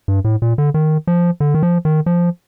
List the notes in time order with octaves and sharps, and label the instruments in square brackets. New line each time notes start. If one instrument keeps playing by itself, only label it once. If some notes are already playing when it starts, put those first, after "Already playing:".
[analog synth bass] G2
A2
A#2
D3
D#3
F3
D3
D#3
F3
D#3
F3